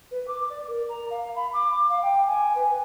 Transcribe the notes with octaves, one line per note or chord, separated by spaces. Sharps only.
B4
D6
D5
A#4
A#5
F5
B5
D6
F5
G5
G#5
B4